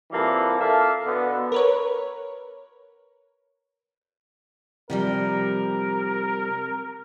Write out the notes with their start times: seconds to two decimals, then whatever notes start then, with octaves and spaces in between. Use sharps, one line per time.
0.11 C3 E3 G3 A#3 F4 A4
0.59 A4 A#4 D5 E5 F5 A5
1.06 B2 D3 B3
1.52 A#4 B4 C#5
4.90 C3 F3 G3 A#4